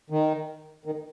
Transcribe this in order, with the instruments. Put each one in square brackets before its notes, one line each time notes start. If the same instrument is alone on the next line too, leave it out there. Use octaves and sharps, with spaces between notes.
[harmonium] D#3
D#3